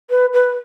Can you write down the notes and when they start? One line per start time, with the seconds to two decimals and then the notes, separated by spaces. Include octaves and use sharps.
0.10 B4
0.33 B4